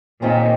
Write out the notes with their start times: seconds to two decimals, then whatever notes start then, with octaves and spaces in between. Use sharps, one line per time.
0.22 D#2 A#2 D#3 C4 D#4 G#4